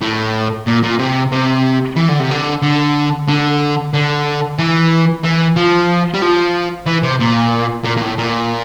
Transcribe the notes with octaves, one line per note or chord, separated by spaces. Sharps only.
A2
A#2
A#2
C3
C3
E3
D3
C3
D3
D3
D3
D3
E3
E3
F3
G3
F3
E3
C3
A#2
A#2
A#2
A2
A#2